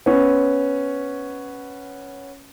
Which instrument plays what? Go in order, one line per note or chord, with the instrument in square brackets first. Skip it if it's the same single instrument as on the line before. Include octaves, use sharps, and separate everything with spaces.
[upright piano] B3 C#4